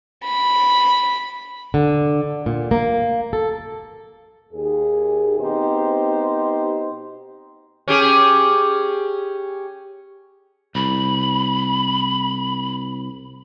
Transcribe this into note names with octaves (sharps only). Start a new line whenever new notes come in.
B5
D3
A#2
A#3
A4
D#2 G#4
B2 C4 D#4 G4 C5
C#4 G4 G#4
C2 B5